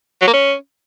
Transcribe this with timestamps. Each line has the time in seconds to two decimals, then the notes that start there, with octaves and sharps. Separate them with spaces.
0.21 F#3
0.27 A#3
0.33 C#4